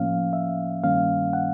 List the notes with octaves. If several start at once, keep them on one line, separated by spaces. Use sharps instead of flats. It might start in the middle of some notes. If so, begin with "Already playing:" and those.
Already playing: A2 F3 A#3 C#4 F5
E5
G2 D#3 G3 A#3 C#4 F5
F#5